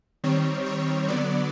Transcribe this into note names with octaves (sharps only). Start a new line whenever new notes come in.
D#3 G3 C4 C#5
C#5
D3 F#3 B3 D5